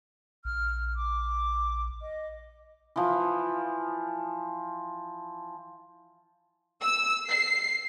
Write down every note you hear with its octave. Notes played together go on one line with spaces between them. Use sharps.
A#1 F6
D6
D#5
E3 F3
E6
C7